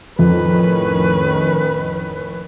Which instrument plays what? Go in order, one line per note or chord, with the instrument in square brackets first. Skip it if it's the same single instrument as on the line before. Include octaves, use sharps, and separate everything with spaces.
[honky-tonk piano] F2 [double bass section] A2 D#3 C#4 [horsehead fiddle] B4